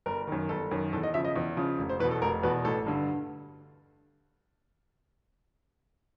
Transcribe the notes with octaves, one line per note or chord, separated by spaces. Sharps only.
G1 A#4
F#2 D#3
G1 A4
F#2 D#3
E2 A4
D#5
C#3 F3 E5
D#5
E2
C#3 F3
F1
C5
E2 B2 B4
A4
F1 A#4
E2 B2 B4
A1 A4
G2 D3